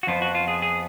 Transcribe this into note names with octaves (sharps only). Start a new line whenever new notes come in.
F#4
F2 F3 B3 F4
F#4
F4
G#4
G#4